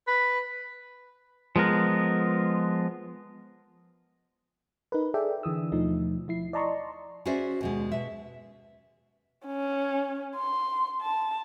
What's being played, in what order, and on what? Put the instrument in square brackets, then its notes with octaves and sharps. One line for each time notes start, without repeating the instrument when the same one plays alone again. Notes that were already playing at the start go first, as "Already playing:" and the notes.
[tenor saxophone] B4
[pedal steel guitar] F3 G#3 B3 A#4
[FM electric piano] D#4 A#4 B4
G#4 A4 D5 E5 G5
D3 E3 D#6 E6
D#2 B2 F3 A3 D#4
F3 E4 C7
D5 D#5 A5 A#5 C6 C#6
[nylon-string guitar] C#4 F#4 G#4 C5 D5 E5
D#2 B2 G#3
B2 E5
[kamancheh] C#4
C6
A5